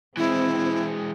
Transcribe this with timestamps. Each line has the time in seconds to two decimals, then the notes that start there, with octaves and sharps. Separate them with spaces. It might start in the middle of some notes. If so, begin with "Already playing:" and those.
0.17 E3 G#3 C4 E4